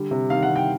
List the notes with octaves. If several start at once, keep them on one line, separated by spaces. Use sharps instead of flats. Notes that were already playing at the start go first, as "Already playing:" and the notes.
Already playing: D3 G3
C3
D#3 F5
F#5
C3
G5